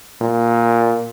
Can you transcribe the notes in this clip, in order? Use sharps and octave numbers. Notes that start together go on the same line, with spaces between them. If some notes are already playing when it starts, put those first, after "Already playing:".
A#2